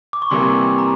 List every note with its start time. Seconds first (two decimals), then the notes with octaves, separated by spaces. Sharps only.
0.13 D6
0.22 C#6
0.30 C3 E3 G3 A#3 C6
0.78 A#5